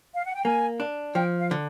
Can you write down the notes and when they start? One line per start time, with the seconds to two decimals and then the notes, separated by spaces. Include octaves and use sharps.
0.15 F5
0.25 F#5
0.35 G5
0.45 A#3 G#5
0.80 D4
1.15 F3 G5
1.40 F5
1.51 D3